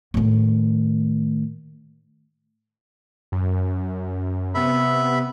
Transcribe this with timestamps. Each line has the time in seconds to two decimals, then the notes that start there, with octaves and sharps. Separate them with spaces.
0.14 A2 D#3
3.32 F#2
4.55 C3 B3 E5 B5